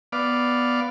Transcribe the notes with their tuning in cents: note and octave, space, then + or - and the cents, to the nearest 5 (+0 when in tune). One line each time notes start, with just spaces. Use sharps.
B3 +0 D5 +0 F5 +0